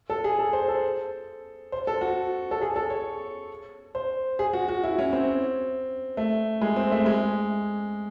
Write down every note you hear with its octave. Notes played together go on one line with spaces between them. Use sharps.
A4
G#4
A4
C5
A4
C5
A4
F#4
A4
G#4
A4
C#5
C5
G#4
F#4
F#4
E4
C#4
C4
A3
G#3
C4
A3
G#3